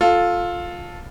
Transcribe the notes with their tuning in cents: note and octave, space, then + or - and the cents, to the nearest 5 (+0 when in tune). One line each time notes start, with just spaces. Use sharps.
F4 +10 A4 +0